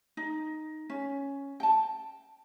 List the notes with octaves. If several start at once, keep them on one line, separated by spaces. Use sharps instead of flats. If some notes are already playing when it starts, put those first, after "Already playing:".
D#4
C#4
G5 A5